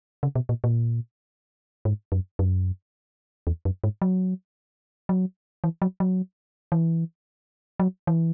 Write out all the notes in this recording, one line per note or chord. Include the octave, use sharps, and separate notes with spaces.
C#3
B2
A#2
A#2
G#2
F#2
F#2
E2
F#2
G#2
F#3
F#3
E3
F#3
F#3
E3
F#3
E3